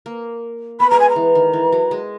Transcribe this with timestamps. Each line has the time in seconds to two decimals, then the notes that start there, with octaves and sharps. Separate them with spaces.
0.06 A#3
0.79 B3 B5
0.90 G#3 A#5
0.99 G#5
1.09 A#5
1.16 E3
1.35 D#3
1.53 E3
1.72 F#3
1.91 G#3